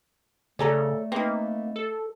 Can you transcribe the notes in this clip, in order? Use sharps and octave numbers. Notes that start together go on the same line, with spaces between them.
C#3 A3 A4 C#5 D5 G#5 A#5
A#3 C4 D#4 B4
A4